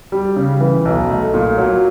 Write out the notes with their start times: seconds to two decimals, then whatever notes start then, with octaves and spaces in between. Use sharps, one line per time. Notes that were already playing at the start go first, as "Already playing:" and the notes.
0.12 G3
0.36 C#3
0.61 E3
0.85 B1
1.10 A3
1.34 A#2
1.58 F#3